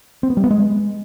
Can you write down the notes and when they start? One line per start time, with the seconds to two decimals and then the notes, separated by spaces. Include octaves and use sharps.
0.23 C4
0.30 B3
0.37 G3
0.44 B3
0.51 G#3